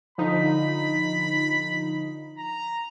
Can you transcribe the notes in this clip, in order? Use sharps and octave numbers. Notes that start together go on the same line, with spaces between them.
D3 F3 D#4 B5
A#5